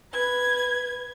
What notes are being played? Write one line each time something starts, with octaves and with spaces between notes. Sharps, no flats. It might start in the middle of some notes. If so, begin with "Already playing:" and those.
B4 G#6